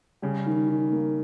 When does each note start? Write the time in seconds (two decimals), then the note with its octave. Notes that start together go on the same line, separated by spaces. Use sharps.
0.22 C#3 G3
0.46 D#3
0.69 D#3
0.92 A#3